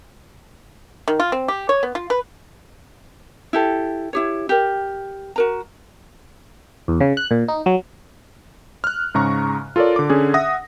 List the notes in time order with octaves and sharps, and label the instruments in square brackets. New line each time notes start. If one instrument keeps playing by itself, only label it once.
[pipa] D#3
F4
C4
G4
C#5
B3
F4
B4
[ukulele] E4 G4 A4
E4 G4 C#5
G4 A#4
F#4 A#4 A#5
[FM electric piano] E2
C#3
F#6
A#2
D#4
F#3
[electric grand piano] F6 F#6
G#2 C#3 A#5 C#6
F4 A4 A#4 C#5 D5
D3 D6
D3 C#4 G#4
E5 F#5 D#6 A#6